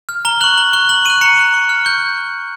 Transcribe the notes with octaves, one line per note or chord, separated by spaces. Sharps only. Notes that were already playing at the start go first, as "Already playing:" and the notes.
F6
A#5 G7
C#6 F#6 F#7
A#5 G7
C#6 F#6 G7
A#5 F#7
C#6 F#6 D#7
A#5 C#7
C#6 F#6
C#6
F6
C#6 G6